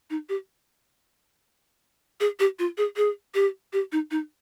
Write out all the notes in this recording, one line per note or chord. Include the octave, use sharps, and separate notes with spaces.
D#4
G4
G#4
G4
F4
G#4
G#4
G4
G4
D#4
D#4